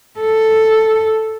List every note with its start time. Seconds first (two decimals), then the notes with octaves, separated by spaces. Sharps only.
0.20 A4